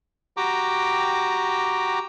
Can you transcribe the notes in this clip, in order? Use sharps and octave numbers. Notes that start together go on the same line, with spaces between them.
F#4 G4 G5 A#5 D6